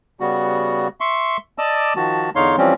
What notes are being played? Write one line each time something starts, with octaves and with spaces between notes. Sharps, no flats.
C#3 G3 B3 F#4
E5 C6 C#6
D5 D#5 A5 D6 E6
D#3 F3 F#4 A5
E2 D3 D#4 C#5 F5 C6
E3 F3 G3 C4 C#4